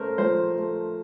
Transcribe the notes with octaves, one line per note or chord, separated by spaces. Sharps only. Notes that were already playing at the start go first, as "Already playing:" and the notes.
Already playing: A3 C#4 A#4 C5
F3 C5
A3